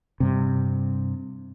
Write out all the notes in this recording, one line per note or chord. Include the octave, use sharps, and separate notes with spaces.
G2 C3